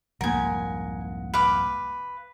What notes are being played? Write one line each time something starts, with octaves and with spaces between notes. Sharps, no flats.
C2 F2 G#2 A#3 A#4 F#5 G#5
B4 F5 D6